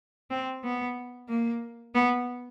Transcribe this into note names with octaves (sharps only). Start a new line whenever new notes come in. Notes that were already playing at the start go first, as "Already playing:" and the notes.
C4
B3
A#3
B3